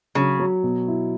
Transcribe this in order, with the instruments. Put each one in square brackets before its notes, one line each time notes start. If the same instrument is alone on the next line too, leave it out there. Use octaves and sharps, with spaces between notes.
[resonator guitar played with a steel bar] C#3 [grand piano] F#3
[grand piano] F#3
B2
E4